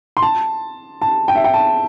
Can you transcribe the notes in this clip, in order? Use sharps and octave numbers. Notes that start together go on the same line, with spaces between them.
C6
A5
A5
G5
E5
G5
A5